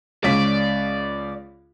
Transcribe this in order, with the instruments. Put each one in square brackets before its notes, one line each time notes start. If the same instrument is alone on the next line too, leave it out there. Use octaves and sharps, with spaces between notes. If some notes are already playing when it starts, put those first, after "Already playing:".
[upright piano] C#2 C#4 B6 [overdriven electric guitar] D5